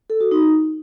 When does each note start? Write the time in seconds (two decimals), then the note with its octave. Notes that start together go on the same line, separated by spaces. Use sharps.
0.10 A4
0.21 F#4
0.31 D#4